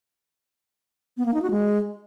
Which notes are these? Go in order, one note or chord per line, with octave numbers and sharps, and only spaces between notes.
B3
A#3
D#4
F#4
G#3